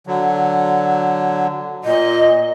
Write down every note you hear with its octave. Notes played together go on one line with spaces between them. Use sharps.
D3 F#3
A#2 D#5